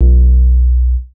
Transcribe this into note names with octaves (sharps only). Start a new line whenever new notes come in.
B1